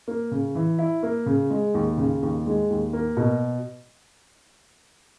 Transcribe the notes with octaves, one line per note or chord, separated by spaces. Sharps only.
A#3
C#3
E3
E4
A#3
C#3
G#3
D#2
C#3
D#2
G#3
D#2
A#3
B2